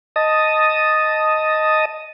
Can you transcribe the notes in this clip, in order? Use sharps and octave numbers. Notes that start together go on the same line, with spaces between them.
D#5 A5 D#6